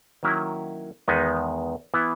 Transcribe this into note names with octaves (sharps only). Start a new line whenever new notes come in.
D#3 F#3 A#3 C#4 E4
E2 D#3 G#3 B3 D#4
E3 B3 E4